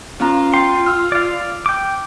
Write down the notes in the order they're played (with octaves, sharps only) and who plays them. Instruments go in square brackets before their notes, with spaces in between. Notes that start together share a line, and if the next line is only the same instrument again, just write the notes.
[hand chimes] B3 C#4 A#5 [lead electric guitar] F4
[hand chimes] G5 [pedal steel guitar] C6
[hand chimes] E6 F6
[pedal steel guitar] D5 F5
G5 D6